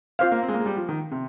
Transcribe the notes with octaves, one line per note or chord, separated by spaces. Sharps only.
C4 F4 C5 F5
A#3
C4
G#3
A#3
G#3
G3
F3
D#3
C3